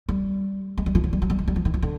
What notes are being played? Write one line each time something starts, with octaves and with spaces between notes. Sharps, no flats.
G3
G#3
G3
F3
F#3
G3
F#3
G3
G#3
G3
F3
D#3
F3
D3